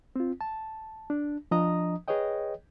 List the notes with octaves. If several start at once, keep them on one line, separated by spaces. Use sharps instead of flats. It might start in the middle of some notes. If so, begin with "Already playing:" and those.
C4 F4
A5
D4
F3 D4 D#5 A#5 D#6
G#4 B4 C#5 D#5 G5